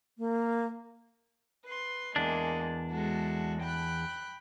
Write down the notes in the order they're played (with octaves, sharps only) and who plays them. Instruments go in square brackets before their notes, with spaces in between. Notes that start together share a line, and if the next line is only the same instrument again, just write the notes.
[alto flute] A#3
[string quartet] B4 C6
[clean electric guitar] E2 D4 [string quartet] G#3 A#3
[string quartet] G#3 F#4 A4
G5 B5 F#6